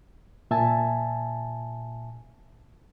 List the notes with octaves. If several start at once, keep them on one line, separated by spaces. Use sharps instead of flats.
A#2 E5 G#5 A5